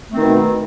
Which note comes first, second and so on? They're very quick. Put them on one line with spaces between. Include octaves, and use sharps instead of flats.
A3 C4 D#3 B2